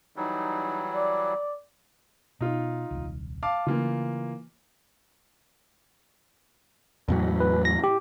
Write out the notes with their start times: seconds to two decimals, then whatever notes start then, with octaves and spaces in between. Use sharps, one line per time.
0.16 E3 F#3 G3 D#4
0.92 D5
2.41 B2 D#4 F4
2.91 D#1 C2
3.43 F5 A5 D6
3.66 C#3 E3 A3 A#3 F4
7.08 E2 A2 F#3
7.40 B4
7.65 A#6
7.84 G4